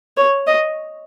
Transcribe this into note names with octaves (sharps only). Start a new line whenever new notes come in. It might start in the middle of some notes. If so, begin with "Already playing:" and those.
C#5
D#5